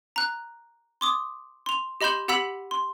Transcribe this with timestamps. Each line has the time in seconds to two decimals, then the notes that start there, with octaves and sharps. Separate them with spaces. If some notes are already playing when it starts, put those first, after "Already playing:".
0.16 A#5 F#6
1.01 C6 D6 D#6
1.66 C6 F7
2.01 G4 D#5 B5 C6 G6 E7
2.28 G4 F#5 B5 E6 B6 F#7
2.71 C6